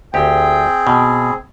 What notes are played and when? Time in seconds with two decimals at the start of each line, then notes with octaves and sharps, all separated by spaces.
0.14 D2 C4 G4 G#4 G5
0.87 B2